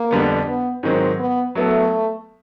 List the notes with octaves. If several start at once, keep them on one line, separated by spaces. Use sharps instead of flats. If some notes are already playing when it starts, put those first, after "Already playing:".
Already playing: A#3
F2 D3 G3 B3
B3
G#2 D#3 F#3 C4
B3
F#3 A3 B3 E4 A4